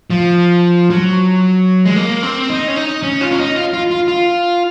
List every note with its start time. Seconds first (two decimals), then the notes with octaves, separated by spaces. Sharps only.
0.10 F3
0.90 F#3
1.86 G#3
1.96 A#3
2.23 C4
2.50 D#4
2.68 C#4
2.76 D#4
3.03 C#4
3.21 F4
3.31 C#4
3.38 D#4
3.56 F4
3.73 F4
3.91 F4
4.08 F4